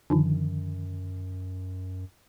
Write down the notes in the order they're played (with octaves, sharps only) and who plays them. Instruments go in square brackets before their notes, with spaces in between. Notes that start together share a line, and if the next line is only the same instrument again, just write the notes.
[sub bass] F#2 [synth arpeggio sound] D3 D#3 F3